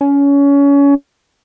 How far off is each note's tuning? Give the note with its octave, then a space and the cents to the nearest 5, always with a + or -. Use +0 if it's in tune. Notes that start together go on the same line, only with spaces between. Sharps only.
C#4 +25